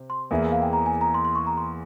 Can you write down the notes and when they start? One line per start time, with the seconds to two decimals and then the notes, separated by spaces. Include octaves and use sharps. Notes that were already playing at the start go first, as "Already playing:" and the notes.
Already playing: C3 C4
0.10 C6
0.31 E2 E3 A#3 E4 G#4 E5
0.52 F5
0.62 G5
0.73 A#5
0.86 G#5
1.01 A#5
1.14 C6
1.25 C6
1.35 C#6
1.47 A#5
1.57 C6